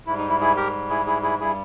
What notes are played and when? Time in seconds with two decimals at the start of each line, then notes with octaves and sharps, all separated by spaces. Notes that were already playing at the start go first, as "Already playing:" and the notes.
0.07 G#2 G3 E4
0.18 D#4
0.29 E4
0.40 E4 G#4
0.56 G4 A#4
0.90 E4 G#4
1.06 E4 G#4
1.23 E4 G#4
1.39 G2 G3 E4 G#4